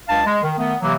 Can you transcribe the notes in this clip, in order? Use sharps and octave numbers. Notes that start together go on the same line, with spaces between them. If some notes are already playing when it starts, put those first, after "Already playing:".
C#2 D4 F5 A5
G#3
D#3
D#3 A3 B3
C3 E3 F#3 A#3